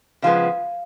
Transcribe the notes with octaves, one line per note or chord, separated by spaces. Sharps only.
C#3 F3 G#3 B3 F5